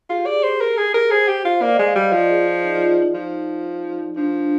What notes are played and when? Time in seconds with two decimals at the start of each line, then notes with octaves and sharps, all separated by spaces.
0.09 F4 G#4
0.17 G4
0.26 G#4 D5
0.43 C5
0.61 A#4
0.77 G#4
0.94 A#4
1.11 G#4 C5
1.28 G4
1.45 F4
1.62 A#3 D5
1.74 D#5
1.79 G#3
1.87 F5
1.95 G3 D#5
2.08 D#5
2.13 F3 D5
2.30 G#4
2.47 F4
2.64 D#4
2.76 F4
2.89 F4
3.02 D#4
3.14 F3 D#4
4.16 F3 D4